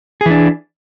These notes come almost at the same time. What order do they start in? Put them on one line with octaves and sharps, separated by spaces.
G#4 E3 D4